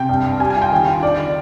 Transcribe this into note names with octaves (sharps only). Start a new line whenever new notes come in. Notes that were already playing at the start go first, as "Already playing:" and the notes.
Already playing: C3 G5
G2
G2
G3 G#5
G#5
F4
G5
D#3
F4
D4 D5
D#3